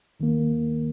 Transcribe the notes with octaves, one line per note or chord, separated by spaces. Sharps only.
D#2 D#3 A#3